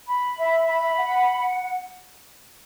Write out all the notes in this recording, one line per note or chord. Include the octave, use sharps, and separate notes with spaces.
B5
E5
B5
F#5